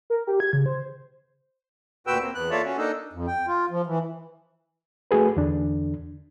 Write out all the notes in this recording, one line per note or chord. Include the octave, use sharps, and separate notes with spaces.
A#4
G4
G#6
C#3
C5
D2 A#2 F#4 B4 G5 E6
A#3 C4
E2 B3 F#6
A#3 F4 A4 C#5 D5 E5
C#4 F#4
A#3 D4 D#4 A4
F2
G5
F4
F3
E3
A3 F#4 G#4 B4
E2 D3 D4